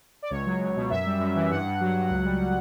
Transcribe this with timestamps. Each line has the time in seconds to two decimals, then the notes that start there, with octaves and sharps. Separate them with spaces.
0.22 D5
0.30 C#2 C#5
0.46 F#3
0.60 C#2
0.76 B2
0.90 F#2 E5
1.06 G3
1.20 F#2
1.35 E3
1.50 G2 F#5
1.65 G2
1.81 F#3
1.95 F#3
2.10 C#2
2.25 G3